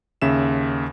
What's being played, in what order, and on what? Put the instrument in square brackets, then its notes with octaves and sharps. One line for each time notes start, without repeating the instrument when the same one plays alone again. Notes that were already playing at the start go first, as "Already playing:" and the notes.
[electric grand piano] D#2 C#3 E5 E7